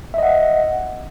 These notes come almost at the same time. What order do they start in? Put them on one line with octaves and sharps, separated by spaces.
E5 D#5 F#5